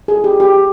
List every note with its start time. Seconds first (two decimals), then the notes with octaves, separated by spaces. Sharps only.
0.08 G#4
0.24 G4
0.40 G4